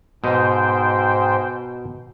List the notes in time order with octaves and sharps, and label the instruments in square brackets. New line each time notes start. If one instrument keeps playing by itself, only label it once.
[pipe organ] G#2 C5 G5 [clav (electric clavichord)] B2 D#5